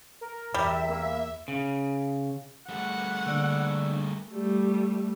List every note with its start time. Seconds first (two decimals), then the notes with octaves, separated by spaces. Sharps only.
0.21 A#4
0.54 E2 G3 E5
0.89 A#3
1.48 C#3
2.69 G3 A3 F#5
3.26 D3 A#3 D4 D5 E6
4.31 G3 A3